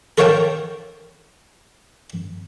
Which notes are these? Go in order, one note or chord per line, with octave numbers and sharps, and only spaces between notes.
A4 A#4 C#5 F5 G5 A5